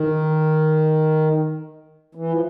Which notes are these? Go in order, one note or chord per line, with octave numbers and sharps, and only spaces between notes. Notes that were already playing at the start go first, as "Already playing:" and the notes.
Already playing: D#3
E3
F3